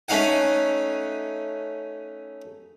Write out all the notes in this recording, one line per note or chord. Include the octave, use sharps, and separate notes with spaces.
A3 C#4 D#4 F5 F#5